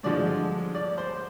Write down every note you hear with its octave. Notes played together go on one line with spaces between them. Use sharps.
G2 D3 F3 G#3 D5
D5
C5